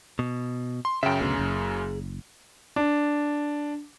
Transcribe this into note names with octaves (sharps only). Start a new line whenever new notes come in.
B2
C6
F#2 C#3 E5 G5
D2 B2 G#4
F#1
D4